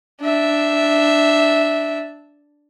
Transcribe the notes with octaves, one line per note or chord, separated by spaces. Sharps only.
D4 E5